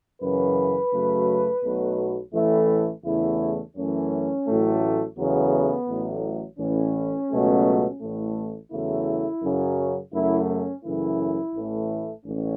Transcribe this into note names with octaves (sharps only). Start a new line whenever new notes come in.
F#2 C#3 E3 B4
F#2 C#3 F#3 A3
B1 B2 F#3 A3
A1 A2 E3 A3
E2 C#3 A3 E4
F#2 E3 A3 C#4
A1 A2 F#3 A3
E2 C#3 F#3 A3 B3
A1 A2 F#3 A3
A1 A2 E3 C#4
C#2 B2 F#3 A3
A1 A2 A3
E2 C#3 F#3 A3 E4
F#2 C#3 F#3
F#2 C#3 A3 E4
C#4
F#2 C#3 E3 A3 E4
A1 A2 E3 A3
A1 C#4